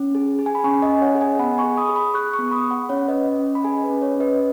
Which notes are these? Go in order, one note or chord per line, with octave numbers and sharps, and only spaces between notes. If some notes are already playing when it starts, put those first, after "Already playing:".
Already playing: C#4
G#4
G#4
G#5
B5
C#4 G#5 C#6
D#5 G#5
C#4
C#5 F#5
G#4
D#5 G#5
B3 F#5 B5
G#5 C#6
G#4
B5 D#6
G#4
B5 D#6
G#4 C#6 F#6
C#6 F#6
B3
C#6
B5 D#6
G#4
F#5 B5
C#4 C#5 F#5
B4 D#5
C#4
C#4
B5
G#4 D#5 G#5
B4
C#4
C#5
C#4
B4 D#5